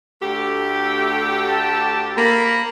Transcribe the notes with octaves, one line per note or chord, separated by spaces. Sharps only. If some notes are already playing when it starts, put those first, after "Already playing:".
D2 A3 G4
A5
A#3 B5